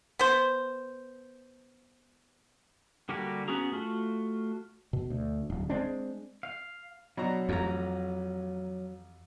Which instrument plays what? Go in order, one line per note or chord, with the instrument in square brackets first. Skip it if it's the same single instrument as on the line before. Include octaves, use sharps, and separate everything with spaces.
[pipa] B3 C5
[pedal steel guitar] D3 G3 A#3 F#4 G4
B3 C#4 F#4 G#4 A#5
A3 F4 F#4
[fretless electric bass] B2
D2
D1
G#3 A#3 C4 D4
[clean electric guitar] F5
[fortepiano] B2 D4 A#5 [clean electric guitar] F#3
[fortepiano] A1 A#5 [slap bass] F2